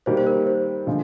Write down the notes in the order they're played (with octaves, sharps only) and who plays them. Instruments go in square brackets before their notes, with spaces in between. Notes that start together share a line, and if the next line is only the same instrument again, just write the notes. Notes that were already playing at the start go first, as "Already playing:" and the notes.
[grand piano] D#3 G3 A#3 [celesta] C5
[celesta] C5
A#4
C5
[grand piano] D3 F3 G#3